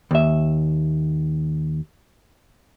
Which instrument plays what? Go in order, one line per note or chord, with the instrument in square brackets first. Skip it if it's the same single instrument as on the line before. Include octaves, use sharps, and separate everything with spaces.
[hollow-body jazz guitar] D#2 E5